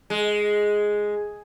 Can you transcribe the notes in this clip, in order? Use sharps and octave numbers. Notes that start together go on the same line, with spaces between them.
G#3